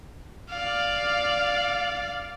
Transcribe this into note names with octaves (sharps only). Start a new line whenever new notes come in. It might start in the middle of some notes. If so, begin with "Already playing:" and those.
D5 F5